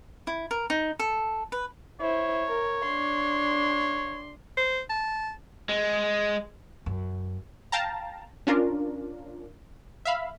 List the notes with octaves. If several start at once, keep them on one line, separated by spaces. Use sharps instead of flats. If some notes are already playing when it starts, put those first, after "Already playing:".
E4
A#4
D#4
A4
B4
E4 C5 C#5
A#4
D4 C6
C5
A5
G#3
F#2
F5 G5 A5 A#5
C#4 D4 F4 A#4
E5 F5 B5